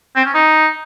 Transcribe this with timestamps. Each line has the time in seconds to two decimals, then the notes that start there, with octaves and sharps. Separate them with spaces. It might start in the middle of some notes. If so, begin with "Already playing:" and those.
0.16 C4
0.25 C#4
0.34 D#4